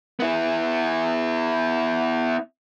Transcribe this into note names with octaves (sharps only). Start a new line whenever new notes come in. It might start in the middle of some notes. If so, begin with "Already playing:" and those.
B3 E4